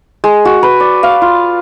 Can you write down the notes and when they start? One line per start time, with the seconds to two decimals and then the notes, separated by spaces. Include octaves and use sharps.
0.24 G#3
0.45 F#4
0.63 B4
0.80 D5
1.03 F5
1.22 F4